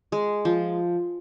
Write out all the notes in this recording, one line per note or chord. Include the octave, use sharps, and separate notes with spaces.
G#3
F3